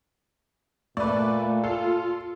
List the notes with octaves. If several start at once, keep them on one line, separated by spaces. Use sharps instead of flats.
A#2 A3 B4 D5
F4 A4